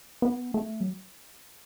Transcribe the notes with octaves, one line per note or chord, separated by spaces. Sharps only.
B3
A3
F#3